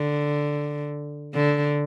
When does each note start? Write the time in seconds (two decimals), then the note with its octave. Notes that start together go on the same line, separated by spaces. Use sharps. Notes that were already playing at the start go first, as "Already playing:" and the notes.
Already playing: D3
1.34 D3